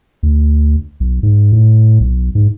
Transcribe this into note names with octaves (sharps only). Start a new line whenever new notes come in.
D2
B1
G#2
A2
B1
G#2